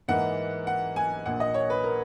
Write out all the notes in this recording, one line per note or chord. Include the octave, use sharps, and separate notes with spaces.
G#2 E3 A#3 D#4 F#5
F#5
G#5
A#1 A#2 A#3 F#5
D#5
C#5
B4
A#4